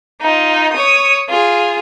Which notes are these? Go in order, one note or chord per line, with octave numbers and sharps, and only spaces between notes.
D#4 F4
C#5 D#6
F4 G#4